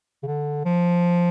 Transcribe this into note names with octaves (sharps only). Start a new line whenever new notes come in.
C#3
D3
F3